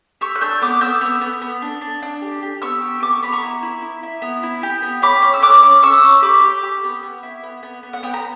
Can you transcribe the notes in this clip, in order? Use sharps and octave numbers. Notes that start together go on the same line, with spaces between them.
G4 C#6 E6
F#6
D4 E6 G6
B3 D6 F#6
B3 E6 G6
B3
B3
B3
D4
D4
D4
G4
G4
B3 C#6 E6
G4
B3 D6
C#6
B3 B5
A#5 C#6
E4
E4
E4
E4
B3
E4
G4
B3
C#4 B5 D6
C#4
E6
C#4 D6 F#6
C#4
C#4 C#6 E6
C#4
G4 B5 D6
G4
G4
B3
B3
E4
B3
B3
B3
F#5
B3 G5
A#5